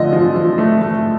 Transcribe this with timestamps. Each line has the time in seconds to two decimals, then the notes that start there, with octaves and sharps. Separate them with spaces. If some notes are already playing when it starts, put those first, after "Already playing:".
Already playing: D3 F3 A3 D#5
0.13 F3
0.35 F3
0.58 A3
0.82 A3